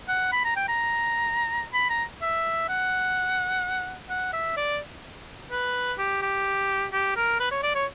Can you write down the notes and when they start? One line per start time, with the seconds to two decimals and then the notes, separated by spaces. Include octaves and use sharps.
0.08 F#5
0.32 B5
0.45 A#5
0.56 G5
0.69 A#5
1.73 B5
1.90 A#5
2.22 E5
2.69 F#5
4.10 F#5
4.33 E5
4.57 D5
5.51 B4
5.98 G4
6.22 G4
6.93 G4
7.16 A#4
7.40 B4
7.51 C#5
7.63 D5
7.75 C#5